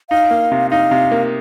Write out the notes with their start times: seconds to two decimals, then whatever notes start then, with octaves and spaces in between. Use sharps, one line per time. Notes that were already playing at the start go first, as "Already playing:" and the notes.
0.10 D#4 F5
0.31 A#3
0.52 C3
0.71 D#4 F5
0.91 C3
1.11 A#3